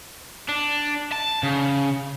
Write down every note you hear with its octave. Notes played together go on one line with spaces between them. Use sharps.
D4
A5
C#3